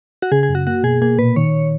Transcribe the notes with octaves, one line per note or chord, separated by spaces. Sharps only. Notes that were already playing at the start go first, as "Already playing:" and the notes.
F#4
C#3 G#4
G#4
F#2
F#4
A#3 F#4
B2 G#4
A#3 G#4
A#2 B4
D#3 C#5